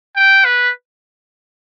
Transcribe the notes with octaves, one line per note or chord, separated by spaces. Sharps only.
G5
B4